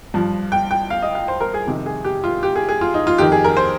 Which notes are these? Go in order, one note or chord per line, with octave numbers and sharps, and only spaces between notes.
G2 F3
G5
G5
F5
D#5
F5
C5
A#4
G#4
F2 C3 D#3
G#4
G4
F4
G4
G#4
G#4
F4
D#4
F4
F2 D#3 G4
G#4
A#4
C5